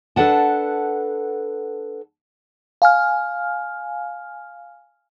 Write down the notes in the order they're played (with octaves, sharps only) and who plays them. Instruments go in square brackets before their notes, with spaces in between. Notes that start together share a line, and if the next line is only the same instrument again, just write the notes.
[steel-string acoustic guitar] D4 A4 B4 F#5 A5
[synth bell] F5 G#5 F6